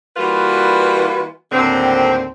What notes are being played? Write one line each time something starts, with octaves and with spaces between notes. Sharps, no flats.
E3 G3 A#3 F4 F#4 B4
D#2 A2 D3 C4